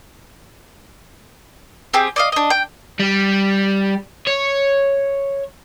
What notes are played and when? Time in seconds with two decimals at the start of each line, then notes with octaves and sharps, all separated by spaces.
1.93 C4 G4 G#4
2.16 D5 D#5 F5
2.32 D4 D#5
2.50 G5
3.00 G3
4.27 C#5